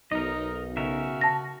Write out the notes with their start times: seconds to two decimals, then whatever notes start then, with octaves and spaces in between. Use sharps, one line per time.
0.12 B1 D#4 A#4 D#5
0.77 C#3 F#4 A#4 E5
1.21 A5 A#6